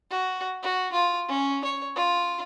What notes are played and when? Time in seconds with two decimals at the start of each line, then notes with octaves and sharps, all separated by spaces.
0.10 F#4
0.63 F#4
0.93 F4
1.28 C#4
1.64 C#5
1.96 F4